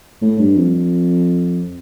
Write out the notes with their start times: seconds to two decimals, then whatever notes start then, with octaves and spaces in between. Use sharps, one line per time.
0.22 A2
0.39 G2
0.56 F2